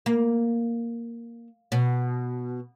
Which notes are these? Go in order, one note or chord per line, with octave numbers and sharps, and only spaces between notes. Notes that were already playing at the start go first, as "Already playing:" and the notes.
A#3
B2